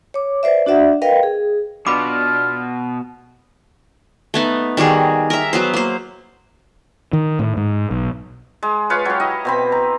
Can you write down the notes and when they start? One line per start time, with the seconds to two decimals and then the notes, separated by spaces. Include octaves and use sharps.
0.14 C#5 D6
0.43 B4 C5 D5 E5
0.66 D4 F#4 D5 E5 F#5
1.02 A#4 B4 D#5 F5 G5
1.23 G#4
1.87 B2 D4 F4 B4 B5 D6
4.34 A3 B3 D#4
4.77 D#3 G3 F#4 G#4
5.30 A#4 E5
5.53 F#3 B3 C5
5.74 A#3 C5
7.13 D#3
7.39 A2
7.57 G#2
7.91 B1
8.63 G#3
8.90 F4 B4 C#5 F5
9.05 F#3 G4
9.20 E4 D#5
9.45 B2 C4 B5
9.72 A#5